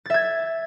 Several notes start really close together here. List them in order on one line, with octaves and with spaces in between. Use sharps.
A6 E5 G#6